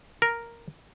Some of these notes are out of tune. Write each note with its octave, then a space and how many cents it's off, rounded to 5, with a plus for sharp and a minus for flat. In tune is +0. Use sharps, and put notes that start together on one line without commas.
A#4 +0